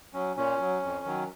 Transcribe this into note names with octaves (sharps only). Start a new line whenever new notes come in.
F#3 C#4
A#2 C#4
F#3
F2
D#3 F#3